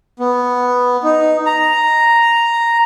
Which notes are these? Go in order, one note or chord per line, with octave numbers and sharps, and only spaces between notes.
B3
D#4
A#5